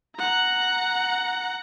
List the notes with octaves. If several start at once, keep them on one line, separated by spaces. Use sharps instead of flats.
F#5 A#5